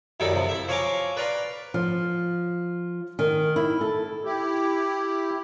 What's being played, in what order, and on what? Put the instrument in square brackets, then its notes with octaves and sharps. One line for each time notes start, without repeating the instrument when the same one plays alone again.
[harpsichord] F#2 D#3 G3 D#4 E4 A4
C3 F3
E4 E5
F3 C#5 F5 G#5 A#5 D6
B4 D5 F5 A#5 C6
[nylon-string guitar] F3
D#3
E4
A4
[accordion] E4 G4